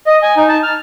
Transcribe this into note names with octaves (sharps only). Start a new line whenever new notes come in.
D#5
G#5
D#4
A5
F6